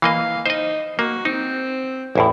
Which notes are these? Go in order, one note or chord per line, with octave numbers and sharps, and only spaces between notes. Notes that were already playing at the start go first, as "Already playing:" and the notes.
E3 A#3 D#5 F5
D#4 C5 D#5
A#3 F#4
C4 D#4
A1 E2 A2 E4